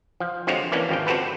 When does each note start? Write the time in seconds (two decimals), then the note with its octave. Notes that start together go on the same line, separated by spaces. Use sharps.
0.20 F3
0.47 D3 F3 G#3 C4 F#4 C#5
0.72 E3 A#3 C#4 D4
0.89 G#1 F2 F3 G5
1.07 C4 F#4 G4 A4 B4